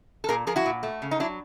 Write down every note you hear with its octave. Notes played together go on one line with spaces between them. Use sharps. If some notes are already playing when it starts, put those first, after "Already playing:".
A4
A#2 G#4 A#4
F3 G#4 A#4
E4 F#4
A#2
A3
C#3
D#4
F#3 D4 E4